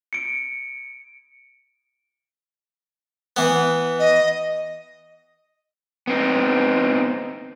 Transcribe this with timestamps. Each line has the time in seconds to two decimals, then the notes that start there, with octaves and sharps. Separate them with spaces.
0.13 C#7 D7
3.37 E3 B3
3.99 D#5
6.07 B3 C4 D#4